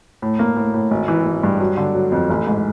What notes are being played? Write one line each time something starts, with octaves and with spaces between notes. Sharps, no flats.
A2
A#3
A2
A2
G#1
E3
G#1
G2
F#3
D3
F#3
F2
A1
G#2